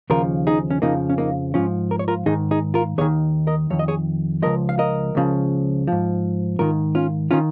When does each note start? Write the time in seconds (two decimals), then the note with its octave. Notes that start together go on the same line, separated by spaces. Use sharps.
0.10 D#2 C#3 F3 F4 A#4
0.47 D#4 G#4
0.70 C#4
0.82 F2 C#3 F3 A#3 D#4
1.10 C#4
1.18 A#3 D#4
1.54 G#2 F3 C#4 F4
1.91 A#4
1.99 C#5
2.08 F4 A#4
2.26 G#2 D#3 D#4 G#4
2.51 D#4 G#4
2.74 F4 A#4
2.98 D#2 G#4 C#5
3.01 D#3
3.47 A#4 D#5
3.70 F2 D#3 C#5
3.79 D#5
3.88 G#4 C#5
4.42 C#2 C#3 F3 A#4 D#5
4.69 F5
4.79 A#4 D#5
5.15 C#2 C#3 F3
5.87 G#2 F3
6.59 G#2 D#3 F4 A#4
6.95 C#4 F4
7.31 D#3 C#4 F4